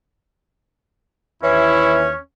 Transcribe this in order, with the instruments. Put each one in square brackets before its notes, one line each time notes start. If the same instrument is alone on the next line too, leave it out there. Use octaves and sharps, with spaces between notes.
[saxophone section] D#2 C#5 [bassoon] E3 [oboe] C#4 [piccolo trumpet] E4